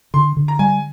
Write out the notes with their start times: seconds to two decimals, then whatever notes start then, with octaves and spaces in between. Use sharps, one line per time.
0.14 D3 C6
0.37 D3
0.48 A#5
0.59 G3 G#5